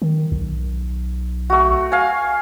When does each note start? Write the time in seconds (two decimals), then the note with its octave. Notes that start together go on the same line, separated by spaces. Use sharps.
0.02 D#3
0.32 B1
1.50 A3 F#4
1.92 F5 G#5